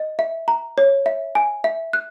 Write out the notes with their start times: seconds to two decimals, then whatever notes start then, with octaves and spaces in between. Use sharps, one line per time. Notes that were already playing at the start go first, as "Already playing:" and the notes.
Already playing: D#5
0.19 E5
0.48 A#5
0.78 C#5
1.06 E5
1.35 G#5
1.64 E5
1.93 F#6